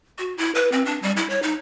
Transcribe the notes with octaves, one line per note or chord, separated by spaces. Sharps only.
F#4
E4
B4
C4
D4
G3
E4
C#5
D#4